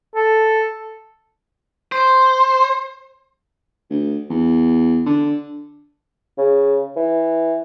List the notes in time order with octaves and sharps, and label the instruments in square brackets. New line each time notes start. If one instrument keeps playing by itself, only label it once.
[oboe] A4
[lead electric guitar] C5
[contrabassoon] D2
E2
D3
[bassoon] C#3
E3